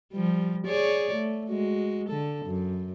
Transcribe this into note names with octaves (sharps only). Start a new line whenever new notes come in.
F3 G3
G#4 C#5 D5
A3
G#3 F#4
D3 A4
F#2